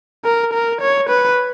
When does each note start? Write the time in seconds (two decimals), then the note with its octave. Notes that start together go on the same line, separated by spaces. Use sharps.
0.25 A#4
0.53 A#4
0.81 C#5
1.09 B4